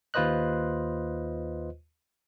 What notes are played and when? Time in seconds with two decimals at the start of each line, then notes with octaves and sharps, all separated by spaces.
0.14 D#2 F4 B4 C5 D#5 F#6